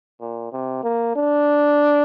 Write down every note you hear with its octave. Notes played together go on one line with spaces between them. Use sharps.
A#2
C3
A#3
D4